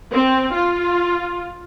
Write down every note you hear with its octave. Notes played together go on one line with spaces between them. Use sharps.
C4
F4